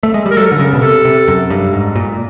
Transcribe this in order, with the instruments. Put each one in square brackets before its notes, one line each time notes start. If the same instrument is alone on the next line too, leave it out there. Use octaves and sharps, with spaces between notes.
[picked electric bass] A3
G#3
G3
[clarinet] A#4
[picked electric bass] F#3 [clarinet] A4
[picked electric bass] D3
[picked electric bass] C#3 [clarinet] A#4
[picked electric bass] B2
[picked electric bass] C3 [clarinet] A4
[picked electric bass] C3
F#2
G2
G#2
A#2